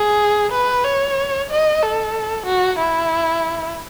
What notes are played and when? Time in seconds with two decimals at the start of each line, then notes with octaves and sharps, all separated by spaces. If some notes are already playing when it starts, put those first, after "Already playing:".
Already playing: G#4
0.52 B4
0.84 C#5
1.50 D#5
1.83 A4
2.47 F#4
2.79 E4